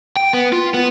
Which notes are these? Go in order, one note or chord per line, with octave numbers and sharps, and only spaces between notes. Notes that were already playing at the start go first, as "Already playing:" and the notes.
G5
B3
F4
B3